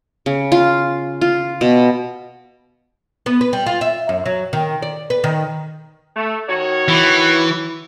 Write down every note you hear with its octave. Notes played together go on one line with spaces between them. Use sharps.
C#3
F4
F4
B2
B3
B4
G3
F4
E5
F#2
F#3
D#3
D5
B4
D#3
A3
D#3 F#4 C#5
E3